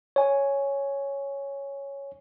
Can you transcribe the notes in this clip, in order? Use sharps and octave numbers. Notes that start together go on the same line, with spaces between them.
C#5 G#5